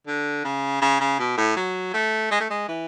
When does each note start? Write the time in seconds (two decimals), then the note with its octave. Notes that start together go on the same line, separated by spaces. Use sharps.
0.07 D3
0.44 C#3
0.82 C#3
1.01 C#3
1.19 B2
1.38 A2
1.56 F#3
1.94 A3
2.31 G#3
2.40 A3
2.50 G#3
2.68 E3